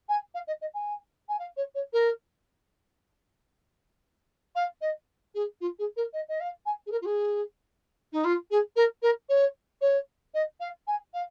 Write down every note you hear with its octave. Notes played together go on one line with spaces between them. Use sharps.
G#5
F5
D#5
D#5
G#5
G#5
F5
C#5
C#5
A#4
F5
D#5
G#4
F4
G#4
A#4
D#5
D#5
F5
G#5
G#4
A#4
F4
G#4
D#4
F4
G#4
A#4
A#4
C#5
C#5
D#5
F5
G#5
F5